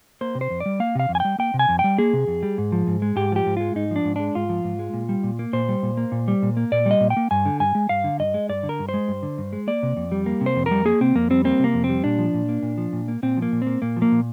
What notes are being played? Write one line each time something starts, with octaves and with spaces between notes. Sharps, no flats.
A#3 C5
C3
C5
F2
D5
G3
A#3 F5
C3 F5
F2
G#5
G3 G5
A#3 G5
C3
G#5
F2
G5
G3
A#3 G#4
C3
F2
G3
G#2
F3
G#2
G#3
G#2 G4
F3 G4
G#2
G#3 F4
G#2 D#4
F3 D4
G#2
G#3 D4
G#2 F4
F3
G#2
G#3
A#2
G3
A#2
A#3
A#2 C5
G3
A#2
A#3
A#2
G3
A#2
A#3
A#2 D5
G3
D#5
A#2
G5
A#3
G2 G#5
D3
G2 G#5
G#3
G2 F5
D3
G2 D#5
G#3
G2 D5
D3
A#4
G2
C5
G#3
G2
D3
G2
G#3
A#3 D5
C3
F2
G3
A#3
C3
C5
F2
G3 A#4
A#3 G#4
C3 C4
F2 A#3
G3 C4
A#3 C4
C3 A#3
F2
C4
G3
A#2 D4
F3
A#2
A#3
A#2
F3
A#2
A#3
A#2 C4
F3
A#3
A#2
A#3 C4
A#2 A#3
F3
A#3
A#2